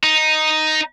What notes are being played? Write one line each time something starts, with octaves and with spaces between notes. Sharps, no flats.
D#4